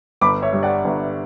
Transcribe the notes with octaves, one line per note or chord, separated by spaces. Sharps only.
G1 B5 D6
C#5 E5
G2
D5 F#5
G1